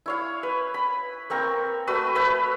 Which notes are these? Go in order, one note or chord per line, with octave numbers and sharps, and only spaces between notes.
E4 C#5 F5
B4
B5
A#3 C4 A#4 C#6
A3 F#4 B4 E6
B4 C#5 E5 B5